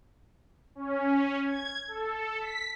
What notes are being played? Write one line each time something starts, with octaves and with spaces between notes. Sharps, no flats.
C#4
G#6
A4
B6